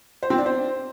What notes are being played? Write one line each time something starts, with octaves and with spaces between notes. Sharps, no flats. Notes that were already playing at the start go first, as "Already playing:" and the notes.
C5
C4
D4
C5